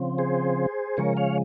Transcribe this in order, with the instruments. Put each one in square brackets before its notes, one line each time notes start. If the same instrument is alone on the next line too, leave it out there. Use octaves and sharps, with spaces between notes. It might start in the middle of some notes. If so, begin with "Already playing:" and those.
Already playing: [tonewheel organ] C#3 F3 C4
G#4 C5
C#3 F3 G#3 A#4 C#5
C#5 F5